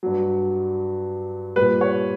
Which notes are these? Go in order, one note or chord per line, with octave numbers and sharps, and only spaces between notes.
G2 F#3
A#2 G3 B4
C#5